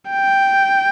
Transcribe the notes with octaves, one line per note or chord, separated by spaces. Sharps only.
G5